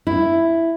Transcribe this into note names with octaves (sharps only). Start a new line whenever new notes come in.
E4